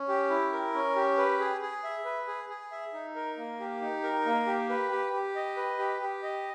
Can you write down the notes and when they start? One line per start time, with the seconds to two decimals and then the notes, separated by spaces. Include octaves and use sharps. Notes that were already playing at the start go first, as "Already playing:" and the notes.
Already playing: C#4
0.09 G4
0.30 E4
0.52 A#4
0.74 C#4
0.96 G4
1.18 B4
1.40 G#4
1.61 G#4
1.84 E5
2.05 B4
2.27 G#4
2.49 G#4
2.72 E5
2.93 D#4
3.16 A#4
3.37 A#3
3.60 G4
3.81 D#4
4.03 A#4
4.26 A#3
4.47 G4
4.69 B4
4.91 G4
5.13 G4
5.36 D#5
5.57 B4
5.79 G4
6.01 G4
6.23 D#5